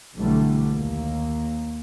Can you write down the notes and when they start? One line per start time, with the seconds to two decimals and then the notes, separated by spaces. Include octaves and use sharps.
0.17 B1 D3 E3 F#3 G3 A3
0.72 D#2 A#3